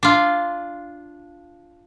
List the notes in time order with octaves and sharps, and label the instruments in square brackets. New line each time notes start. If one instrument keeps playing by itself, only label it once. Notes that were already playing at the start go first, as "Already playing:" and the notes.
[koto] D4 F4